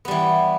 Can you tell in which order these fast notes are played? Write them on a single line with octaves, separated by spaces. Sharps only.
B3 G3 E3